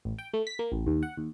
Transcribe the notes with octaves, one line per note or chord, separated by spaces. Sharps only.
A1
G5
A3
B6
A#3
A1
D#2
F#5
D#2